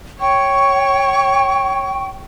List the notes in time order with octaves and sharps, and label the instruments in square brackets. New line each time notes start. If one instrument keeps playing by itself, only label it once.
[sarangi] C#5 [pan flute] G5 [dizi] C#6